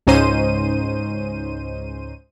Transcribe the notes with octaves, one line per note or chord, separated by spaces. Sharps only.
C#2 G#2 C#4 D#4 C5 D#7